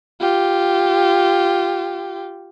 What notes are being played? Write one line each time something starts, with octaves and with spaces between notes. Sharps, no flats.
F4 G4